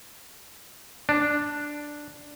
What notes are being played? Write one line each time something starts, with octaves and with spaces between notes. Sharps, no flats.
D4